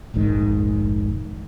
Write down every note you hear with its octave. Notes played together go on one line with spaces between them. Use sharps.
F1 A#1 G#2 D#3